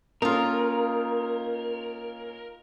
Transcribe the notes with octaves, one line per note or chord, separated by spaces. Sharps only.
A#3 C#4 D#4 F4 A4 A#4